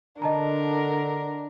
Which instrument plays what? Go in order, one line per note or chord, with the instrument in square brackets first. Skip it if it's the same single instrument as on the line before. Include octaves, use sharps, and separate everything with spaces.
[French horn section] D3 [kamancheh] D4 [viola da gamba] A#4 [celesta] D#5 A5 A#5